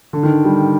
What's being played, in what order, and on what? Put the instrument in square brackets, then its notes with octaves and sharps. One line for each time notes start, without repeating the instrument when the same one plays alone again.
[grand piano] D3
D#3
G3